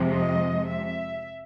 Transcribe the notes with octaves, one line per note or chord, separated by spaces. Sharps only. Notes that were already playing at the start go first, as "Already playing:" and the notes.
Already playing: F2 C3 F3 G#3
D#5
E5